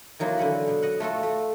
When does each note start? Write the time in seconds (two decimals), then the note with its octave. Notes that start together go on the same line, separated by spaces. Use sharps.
0.19 D#3 E3 F#3 A#3 D#4 F4
0.38 D3 C#4 F#5 B5
0.68 B2
0.82 D#5 F#5
1.00 A3 F4 F#4 A4
1.23 A3